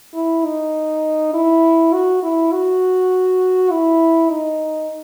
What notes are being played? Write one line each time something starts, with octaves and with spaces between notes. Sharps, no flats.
E4
D#4
E4
F#4
E4
F#4
E4
D#4